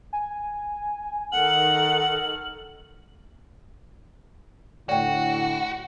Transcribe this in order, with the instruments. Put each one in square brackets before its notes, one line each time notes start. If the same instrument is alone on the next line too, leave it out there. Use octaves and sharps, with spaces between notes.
[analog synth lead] G#5
[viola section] D#3 A4 [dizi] F#5 [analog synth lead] F6 [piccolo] F#7
[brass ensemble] A2 D3 [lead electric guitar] F#4 [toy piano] D5 G5